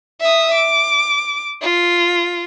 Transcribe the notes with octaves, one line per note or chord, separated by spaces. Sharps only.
E5 D#6
D6
F4